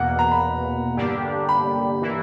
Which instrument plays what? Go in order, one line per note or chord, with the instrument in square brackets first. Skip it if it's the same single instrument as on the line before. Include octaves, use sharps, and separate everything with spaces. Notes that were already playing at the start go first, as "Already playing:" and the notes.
Already playing: [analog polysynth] E2 B2 A#3 [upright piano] F#5
[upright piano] A#5
B5
[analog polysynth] G2 D3 A#3 D4 G4
[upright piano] B5
[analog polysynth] E3 A#3 E4